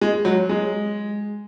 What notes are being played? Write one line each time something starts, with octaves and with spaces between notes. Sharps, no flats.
G#3
F#3
G#3